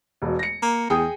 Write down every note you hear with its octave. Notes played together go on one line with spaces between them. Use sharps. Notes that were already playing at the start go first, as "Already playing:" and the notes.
E1 B2
A#6 C#7
A#3
E2 G#4 G5 D#6